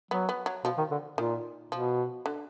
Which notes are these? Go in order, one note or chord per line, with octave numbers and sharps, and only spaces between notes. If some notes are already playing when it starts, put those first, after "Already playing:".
F#3 B3
B3
F#3
B2 F3
D#3
D3
A#2 D#3
B2 F3
D3